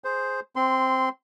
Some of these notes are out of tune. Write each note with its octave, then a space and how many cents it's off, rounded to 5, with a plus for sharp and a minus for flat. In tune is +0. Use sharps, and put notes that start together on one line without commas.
G#4 +0 C5 +0
C4 +0 C6 -15